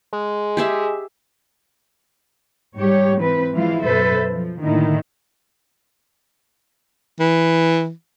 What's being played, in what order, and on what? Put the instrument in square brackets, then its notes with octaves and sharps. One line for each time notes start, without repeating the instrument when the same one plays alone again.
[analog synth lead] G#3
[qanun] G4 G#4 E5
[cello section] G#2 G3 G4 C#5
E3 C4 B4
E3 F3 G#3 E4 F4 F5
F#2 B2 A4 B4 C5 E5
F3
A2 D3 D#3 A#3 D#4 E4
[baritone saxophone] E3